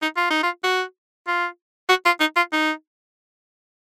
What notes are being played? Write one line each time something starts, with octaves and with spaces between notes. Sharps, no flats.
D#4
F4
D#4
F4
F#4
F4
F#4
F4
D#4
F4
D#4